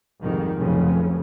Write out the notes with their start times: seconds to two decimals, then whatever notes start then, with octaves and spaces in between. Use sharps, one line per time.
0.22 C2 F2 G#2 D#3
0.55 F1 B1 F2 C#3 C#4